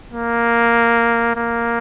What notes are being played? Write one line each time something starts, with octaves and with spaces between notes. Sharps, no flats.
A#3
A#3